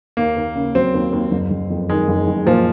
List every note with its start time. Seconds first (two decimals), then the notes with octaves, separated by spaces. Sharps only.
0.17 D#2 A#3
0.36 D#2
0.55 C#3
0.75 F#3 C4
0.94 D#2
1.12 D#2
1.31 F#1
1.51 F#1
1.70 F2
1.89 D#3 G#3
2.08 F#1
2.27 F#1
2.46 A#2 F3